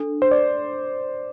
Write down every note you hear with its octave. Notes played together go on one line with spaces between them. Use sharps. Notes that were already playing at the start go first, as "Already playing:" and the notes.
Already playing: D4 A4
C5
D5